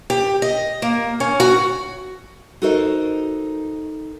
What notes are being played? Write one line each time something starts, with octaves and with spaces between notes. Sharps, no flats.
G4
D#5
A#3
C#4
F#4
D#4 F#4 A4 A#4 C5 D#5